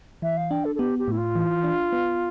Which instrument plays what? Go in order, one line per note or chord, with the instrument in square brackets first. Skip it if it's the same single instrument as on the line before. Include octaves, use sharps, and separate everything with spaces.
[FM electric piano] E3 [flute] E5
[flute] F5
[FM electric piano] D4 [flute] G5
[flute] A4
A4
[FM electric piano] B3 [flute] G4
[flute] G4
[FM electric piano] A2 [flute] E4
[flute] F4
[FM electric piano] E3
D4
B3